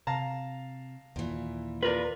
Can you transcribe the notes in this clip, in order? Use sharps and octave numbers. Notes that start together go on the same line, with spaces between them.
C3 F5 A5 A#5
D#2 A#2 E3
F4 A#4 B4 D5